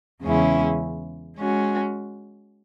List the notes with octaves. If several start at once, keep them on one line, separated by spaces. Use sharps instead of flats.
E2 C#3 G#3 C#4 E4
G#3 C#4 F#4